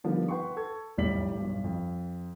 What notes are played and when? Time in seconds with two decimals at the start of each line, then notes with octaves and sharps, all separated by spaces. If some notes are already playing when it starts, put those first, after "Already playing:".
0.04 D3 D#3 F3 G3 A#3 B3
0.28 B4 F#5 G5 C6 C#6
0.57 A4 C#6 G#6
0.97 F1 B1 A2 G3 B6 F#7
1.36 B1 G2
1.64 F2